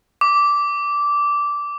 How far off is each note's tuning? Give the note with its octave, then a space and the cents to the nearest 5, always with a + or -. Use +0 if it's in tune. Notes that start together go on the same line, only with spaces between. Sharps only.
D6 -10